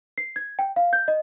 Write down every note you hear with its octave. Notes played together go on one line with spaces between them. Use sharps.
C7
G#6
G5
F5
G6
D#5